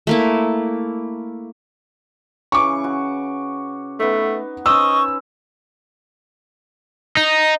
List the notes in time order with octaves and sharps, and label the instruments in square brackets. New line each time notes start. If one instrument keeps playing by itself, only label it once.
[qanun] A3 A#3 E4
[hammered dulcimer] C#3 E3 [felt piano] C#6 D6
[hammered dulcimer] F#4
[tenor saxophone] A3 [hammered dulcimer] B3 D#4
[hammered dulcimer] C#4 B4 C5 [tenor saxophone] D#5 [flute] C#6 [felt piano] E6
[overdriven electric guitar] D#4